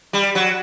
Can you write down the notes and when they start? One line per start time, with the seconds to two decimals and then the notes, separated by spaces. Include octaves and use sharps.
0.13 G3
0.35 F#3